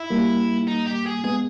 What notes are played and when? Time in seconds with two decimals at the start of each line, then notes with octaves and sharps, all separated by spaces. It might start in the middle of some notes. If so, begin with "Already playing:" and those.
Already playing: E4
0.10 G3 A#3
0.67 D#4
0.86 G4
1.06 G#4
1.24 G#3 B3 G#4